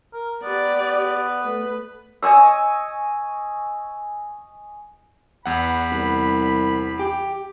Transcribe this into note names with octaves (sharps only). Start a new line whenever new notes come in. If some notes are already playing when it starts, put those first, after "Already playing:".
A#4
B3 G4 D5
A3 B4
D#5 G#5 C#6 E6
E2 F#5 B5
C2
G4